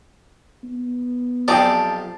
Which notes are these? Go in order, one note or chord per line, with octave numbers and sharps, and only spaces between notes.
B3
B1 F3 C4 G4 G#4 D5 A5 D6